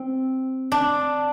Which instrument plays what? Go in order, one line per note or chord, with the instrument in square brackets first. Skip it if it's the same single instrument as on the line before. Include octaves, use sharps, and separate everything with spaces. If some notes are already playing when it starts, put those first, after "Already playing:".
Already playing: [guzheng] C4
D4